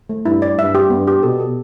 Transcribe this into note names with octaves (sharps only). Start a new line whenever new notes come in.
A3
G2 E4
D5
G2 E5
G4
G2 B3
G4
B2 A4
A4